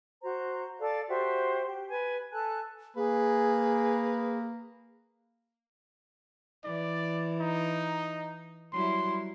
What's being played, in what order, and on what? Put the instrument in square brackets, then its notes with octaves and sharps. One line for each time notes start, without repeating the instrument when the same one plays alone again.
[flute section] F#4 C5 A#5
A4 D5 F5 A5
F#4 G4 C5 E5
G4
B4 G#5
A4 G#5 A5 F#6
[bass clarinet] A#3 [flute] G#4 [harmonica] B4
[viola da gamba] E3 [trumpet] D5
[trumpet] D#4
[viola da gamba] F#3 G3 E4 [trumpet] C6